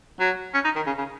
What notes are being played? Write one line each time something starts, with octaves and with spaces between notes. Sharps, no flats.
F#3
C#4
D#4
D#3
C#3
C#3